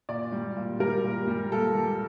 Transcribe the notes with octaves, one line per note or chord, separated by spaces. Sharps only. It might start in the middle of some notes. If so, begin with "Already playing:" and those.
A#2 D5
G3
A#2
G3 A#4
A#2
G3
A#2 A4
G3